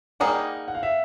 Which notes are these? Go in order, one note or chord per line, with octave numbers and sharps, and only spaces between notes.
G3 A#3 D#4 G#4 F#5
F#5
F5
E5